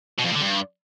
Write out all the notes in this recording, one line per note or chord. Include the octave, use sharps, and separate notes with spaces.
B2
F2
A2
D3
G2